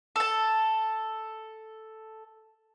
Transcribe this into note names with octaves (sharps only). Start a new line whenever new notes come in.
A4 A5